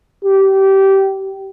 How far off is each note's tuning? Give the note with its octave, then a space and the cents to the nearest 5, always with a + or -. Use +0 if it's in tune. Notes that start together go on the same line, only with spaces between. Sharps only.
G4 -20